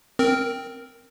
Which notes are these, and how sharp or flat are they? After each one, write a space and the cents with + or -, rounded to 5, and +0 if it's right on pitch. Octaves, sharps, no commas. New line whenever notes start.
C4 +0 A#4 +0